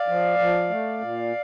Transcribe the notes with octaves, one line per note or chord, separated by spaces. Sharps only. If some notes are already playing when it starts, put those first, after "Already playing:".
Already playing: D5 F5
F3
F3
A3
A#2